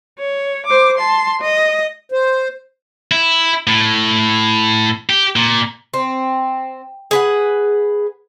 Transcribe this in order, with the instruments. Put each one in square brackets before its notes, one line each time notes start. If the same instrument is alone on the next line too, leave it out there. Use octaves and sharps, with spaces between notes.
[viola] C#5
C5 D6
A5 C6
D#5
[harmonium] C5
[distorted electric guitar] E4
A2
G4
A#2
[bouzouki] C4
G#4 B4 F#5